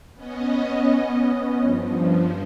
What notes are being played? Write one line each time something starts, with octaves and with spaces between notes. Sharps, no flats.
B3 C#4 D#5
G2 F3